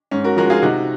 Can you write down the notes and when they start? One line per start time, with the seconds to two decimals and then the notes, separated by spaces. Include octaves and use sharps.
0.11 G#2 C#4
0.24 F#4 A#4
0.37 F3 G#3 F#4 A#4
0.50 F4 G#4
0.62 C3 D#4 F#4